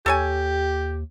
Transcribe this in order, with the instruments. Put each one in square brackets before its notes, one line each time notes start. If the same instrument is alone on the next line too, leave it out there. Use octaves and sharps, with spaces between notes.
[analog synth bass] D#2 [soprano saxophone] G4 [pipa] A4 C#5 G#5